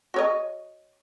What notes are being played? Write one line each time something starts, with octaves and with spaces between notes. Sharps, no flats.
F#4 C#5 D#5